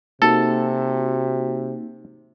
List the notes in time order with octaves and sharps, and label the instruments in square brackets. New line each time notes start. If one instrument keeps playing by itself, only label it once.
[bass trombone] C3 [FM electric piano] A#3 D#4 F#4 [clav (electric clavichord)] A4